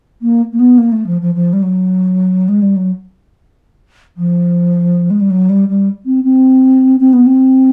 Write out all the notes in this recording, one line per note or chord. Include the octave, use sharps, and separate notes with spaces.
A#3
A#3
B3
A#3
A3
F3
F3
F3
G3
F#3
G#3
G3
F#3
F3
G#3
G3
F#3
G3
G3
C4
C4
C4
B3
C4